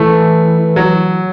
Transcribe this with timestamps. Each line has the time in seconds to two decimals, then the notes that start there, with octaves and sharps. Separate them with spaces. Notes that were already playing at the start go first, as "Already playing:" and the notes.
Already playing: E3 A3
0.76 F#3